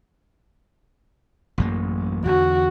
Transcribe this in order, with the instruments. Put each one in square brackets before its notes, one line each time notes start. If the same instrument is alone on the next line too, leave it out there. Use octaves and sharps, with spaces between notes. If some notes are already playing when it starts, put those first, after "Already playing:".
[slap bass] A1 F#2 A#3
[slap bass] E2 D3 [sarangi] F#4